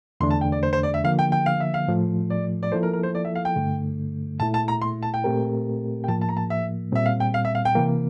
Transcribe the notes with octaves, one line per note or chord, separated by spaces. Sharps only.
E2 D3 A3 D4 C6
A5
G5
D5
C5
C5
D5
E5
D3 F3 A#3 F5
G5
G5
F5
E5
F5
A2 F3 A3
D5
D5
F3 A#3 E4 A4 C5
A#4
A#4
C5
D5
E5
F5
G5
G2 D3 A3
A#2 A3 E4 A5
A5
A#5
C6
A5
G5
A#2 A3 C4 G4 A#4
G5
A2 F3 A#3 A5
A5
A#5
A5
E5
A#2 G3 C4 E5
F5
G5
F5
E5
F5
G5
C3 E3 A#3